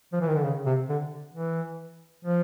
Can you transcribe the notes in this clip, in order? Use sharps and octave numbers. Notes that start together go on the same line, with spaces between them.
F3
E3
D#3
D3
C#3
C3
D3
E3
F3